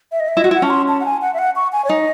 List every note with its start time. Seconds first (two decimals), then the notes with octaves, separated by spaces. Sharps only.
0.12 E5
0.20 D#5
0.28 E5
0.37 E4 D#5
0.44 F#4
0.51 E4
0.54 F#5
0.62 C#4 A5
0.70 C6
0.88 A5
1.00 F#5
1.05 G#5
1.22 F#5
1.34 E5
1.39 F#5
1.56 C#6
1.72 G#5
1.85 C#5
1.89 D#4 D#5